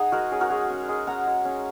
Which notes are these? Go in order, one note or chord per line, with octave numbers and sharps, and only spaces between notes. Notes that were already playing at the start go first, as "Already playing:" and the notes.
Already playing: D#4 G#4 F#5 G#5 A#5
G#3 F#4 A#4
C#4 G#4
F#4 A#4
G#3 G#4
C#4
G#3 G#4
C#4 F#5 A#5
G#3
C#4